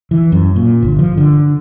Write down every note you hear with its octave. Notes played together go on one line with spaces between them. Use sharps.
E3
F#2
A#2
G1
F3
D3